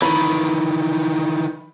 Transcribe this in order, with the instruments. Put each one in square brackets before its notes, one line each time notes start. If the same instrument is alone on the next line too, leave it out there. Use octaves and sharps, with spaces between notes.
[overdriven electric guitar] D#3 E3 [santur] B5